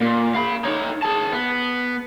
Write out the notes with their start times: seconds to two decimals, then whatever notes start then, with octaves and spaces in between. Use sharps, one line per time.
0.01 A#2
0.35 F5 B5
0.64 D#4 C#5
1.02 G#4 A5
1.32 B3